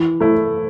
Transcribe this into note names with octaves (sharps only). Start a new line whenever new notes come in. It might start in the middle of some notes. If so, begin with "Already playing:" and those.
Already playing: E3
A3 E4